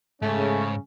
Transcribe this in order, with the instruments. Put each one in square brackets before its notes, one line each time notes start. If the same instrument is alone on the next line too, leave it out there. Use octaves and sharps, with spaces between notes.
[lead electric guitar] G#2 [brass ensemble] C#3 C#4 [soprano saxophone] A3